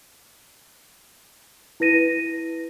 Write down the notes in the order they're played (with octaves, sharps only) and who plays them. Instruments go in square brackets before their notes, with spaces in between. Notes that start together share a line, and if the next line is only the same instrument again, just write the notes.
[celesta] E4 B4 A#6 D#7